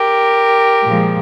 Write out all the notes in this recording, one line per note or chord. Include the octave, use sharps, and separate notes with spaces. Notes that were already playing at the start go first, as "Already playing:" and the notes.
Already playing: G4 A#4
A#2 F3 G#3